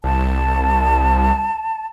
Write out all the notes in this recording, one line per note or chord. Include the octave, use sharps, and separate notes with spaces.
C2 A5